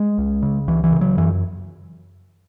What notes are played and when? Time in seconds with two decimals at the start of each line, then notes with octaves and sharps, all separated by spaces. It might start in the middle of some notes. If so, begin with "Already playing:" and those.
Already playing: G#3
0.18 C#2
0.42 C#3
0.68 C#2 E3
0.84 E3
0.92 C#3
1.01 F#3
1.17 F#2 E3